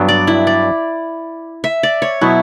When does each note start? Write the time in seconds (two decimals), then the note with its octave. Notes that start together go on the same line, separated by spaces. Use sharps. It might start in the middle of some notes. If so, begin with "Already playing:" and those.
Already playing: G2 F#3 B3 D4
0.08 D5
0.27 E4
0.47 D5
1.64 E5
1.83 D5
2.02 C#5
2.21 B2 F#3 B3 E4